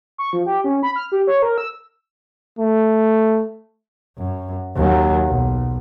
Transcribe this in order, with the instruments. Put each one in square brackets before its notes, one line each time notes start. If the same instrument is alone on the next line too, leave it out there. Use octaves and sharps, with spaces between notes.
[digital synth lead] C#6
F3
G4
C#4
B5
F6
G4
C#5
A#4
E6
[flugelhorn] A3
[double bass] F#2
D#2 F#3
B1